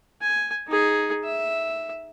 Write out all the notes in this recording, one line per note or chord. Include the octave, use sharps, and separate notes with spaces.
G#5
D#4 G#4
E5